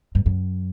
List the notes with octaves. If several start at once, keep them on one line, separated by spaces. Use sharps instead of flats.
G2
F#2